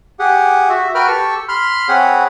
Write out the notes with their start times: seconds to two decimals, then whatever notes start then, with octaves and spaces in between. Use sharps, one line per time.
0.19 G4 G#4 F#5
0.69 F#4 E5
0.95 F#4 A#4 B4 G5 B5 F6
1.07 G4 A4 C#6 E6
1.49 B5 C6 F6
1.89 C4 G#4 C#5 F#5 B5